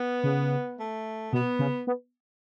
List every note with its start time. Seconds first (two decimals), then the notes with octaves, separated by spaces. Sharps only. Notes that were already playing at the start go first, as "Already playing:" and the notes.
Already playing: B3
0.23 C#3
0.78 A3
1.32 B2 B3
1.59 C#3
1.87 B3